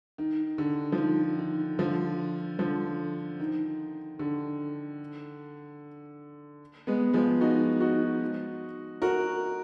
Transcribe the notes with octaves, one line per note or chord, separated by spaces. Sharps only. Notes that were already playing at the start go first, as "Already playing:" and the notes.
D#3
D3
F3
D#3
D#3
D3 F3
D3 F3
D#3
D3
G#3 B3
F3 G#3
D#4 F#4
D#4 F#4
F#4 A#4